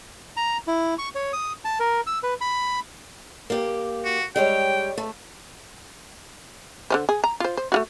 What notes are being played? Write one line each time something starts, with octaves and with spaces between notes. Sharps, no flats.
A#5
E4
C#6
C#5
D#6
A5
A#4
E6
B4
B5
A#3 G4
F#4
G3 G#3 C#5 G5
A3
D3 G#3 C5
G#4
A#5
F4 C5
C5
A3 F4 F#4